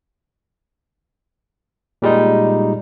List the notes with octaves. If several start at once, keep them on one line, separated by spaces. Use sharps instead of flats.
A#2 G3 G#3 D#4